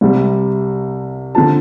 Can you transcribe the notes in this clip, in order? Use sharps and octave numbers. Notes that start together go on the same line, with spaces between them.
C2 C3 G3
D3 F3 A5